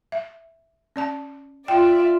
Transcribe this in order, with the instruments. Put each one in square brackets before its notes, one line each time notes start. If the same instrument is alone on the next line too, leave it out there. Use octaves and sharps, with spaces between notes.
[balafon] E5
C#4 D5 A5
[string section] F4 D5 E5 [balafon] G5